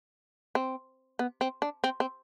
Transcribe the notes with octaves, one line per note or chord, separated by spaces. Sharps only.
C4
B3
C4
D4
C4
C4